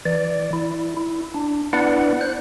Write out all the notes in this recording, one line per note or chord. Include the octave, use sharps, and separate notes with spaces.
E3 D5
E4
E4
D4
B3 D4 E4 B4 D5 F#5
C5 F#6